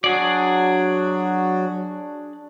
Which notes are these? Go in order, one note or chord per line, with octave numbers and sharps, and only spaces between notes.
F#3 D4 F#4 G#4 D5